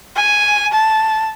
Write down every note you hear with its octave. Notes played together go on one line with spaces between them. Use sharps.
G#5
A5